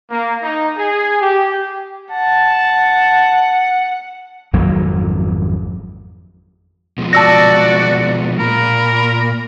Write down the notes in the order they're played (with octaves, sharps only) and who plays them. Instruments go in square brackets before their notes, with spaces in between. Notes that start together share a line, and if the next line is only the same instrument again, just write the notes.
[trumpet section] A#3
D#4
G#4
G4
[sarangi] F#5 [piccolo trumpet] A5
[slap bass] G#1 F2 F#3 A#3
[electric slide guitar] B2 F3 G#3
[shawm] F#4 [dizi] D5 [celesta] A5 E6 A#6
[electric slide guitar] A#2 [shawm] A#4 [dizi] B5